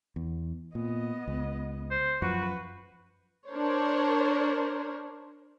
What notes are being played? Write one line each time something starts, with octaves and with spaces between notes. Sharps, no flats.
E2
A#2 B3 D#5
C#2
C5
F#2 F3 F#4 B4
D4 A#4 C5 C#5